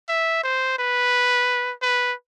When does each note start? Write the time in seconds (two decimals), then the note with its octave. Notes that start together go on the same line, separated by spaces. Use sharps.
0.09 E5
0.44 C5
0.79 B4
1.82 B4